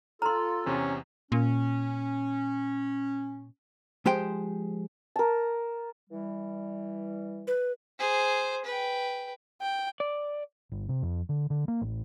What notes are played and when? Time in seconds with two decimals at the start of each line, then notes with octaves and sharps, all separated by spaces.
0.22 F4 A4 A#5 C6 F6
0.66 E2 C3 C#4
1.32 A#2 C#4
4.06 F3 G#3 G4 C5 G5
5.16 A#4 A5
6.10 E3 G3
7.47 B4
7.99 G#4 C5
8.65 B4 G5
9.61 G5
10.00 D5
10.72 G1
10.89 C3
11.02 F2
11.29 D3
11.50 D3
11.68 A#3
11.81 A1